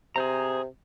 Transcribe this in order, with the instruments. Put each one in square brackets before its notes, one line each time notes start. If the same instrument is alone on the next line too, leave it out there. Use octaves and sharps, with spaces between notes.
[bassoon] C3 [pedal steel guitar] G#4 C5 A#5